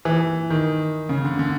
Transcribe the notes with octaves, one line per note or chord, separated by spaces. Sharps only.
E3
D#3
C#3
D3
D3